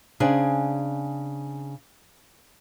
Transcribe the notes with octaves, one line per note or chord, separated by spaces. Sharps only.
C#3 C4 D4 G#4